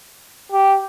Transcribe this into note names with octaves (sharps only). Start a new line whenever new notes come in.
G4